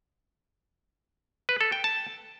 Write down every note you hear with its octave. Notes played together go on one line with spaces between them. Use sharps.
B4
A4
G5
A5